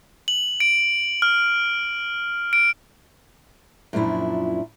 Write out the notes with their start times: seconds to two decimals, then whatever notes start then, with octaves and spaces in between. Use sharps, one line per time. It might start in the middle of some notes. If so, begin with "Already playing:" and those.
0.28 F#7
0.60 D7
1.22 F6
2.53 D7
3.93 F#2 A#2 F3 D4 E4